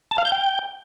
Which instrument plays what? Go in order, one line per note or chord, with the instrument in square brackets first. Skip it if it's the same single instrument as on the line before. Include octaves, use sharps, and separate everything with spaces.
[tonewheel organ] A5
F5
G6
G5